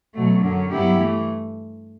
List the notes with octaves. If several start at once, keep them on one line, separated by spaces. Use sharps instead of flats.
B2 F#3 A3
F#2 D3 F#3 C#4
G2 F#3 B3 E4 G4
E3 A3